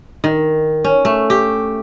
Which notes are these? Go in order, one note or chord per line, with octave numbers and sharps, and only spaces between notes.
D#3
C#4
A3
G4